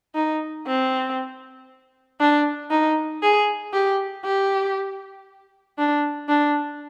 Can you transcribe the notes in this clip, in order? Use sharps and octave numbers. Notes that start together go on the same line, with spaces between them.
D#4
C4
D4
D#4
G#4
G4
G4
D4
D4